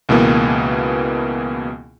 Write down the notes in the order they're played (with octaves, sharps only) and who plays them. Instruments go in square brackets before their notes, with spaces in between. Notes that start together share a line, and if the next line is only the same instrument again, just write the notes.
[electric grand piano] C#2 B2 E3 A#3 B3